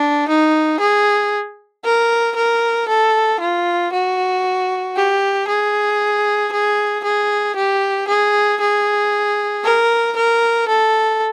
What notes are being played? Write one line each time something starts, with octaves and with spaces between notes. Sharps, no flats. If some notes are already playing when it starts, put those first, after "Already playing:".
Already playing: D4
D#4
G#4
A#4
A#4
A4
F4
F#4
G4
G#4
G#4
G#4
G4
G#4
G#4
A#4
A#4
A4